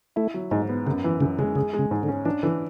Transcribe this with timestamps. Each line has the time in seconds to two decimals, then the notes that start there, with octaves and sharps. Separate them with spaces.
0.16 A3 E4
0.34 F#3
0.51 G#2 G#3
0.69 B3
0.86 F#2 C#3
1.04 E3
1.21 F#2 C#3
1.39 C#3 G#3
1.56 C#3 G#4
1.73 G#3
1.79 C#3
1.91 G#2
2.03 D3
2.08 C#4
2.25 E3 D4
2.43 D3 E3